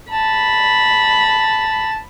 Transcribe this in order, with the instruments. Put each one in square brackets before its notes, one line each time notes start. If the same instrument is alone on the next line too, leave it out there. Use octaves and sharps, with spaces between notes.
[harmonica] A5 [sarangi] B5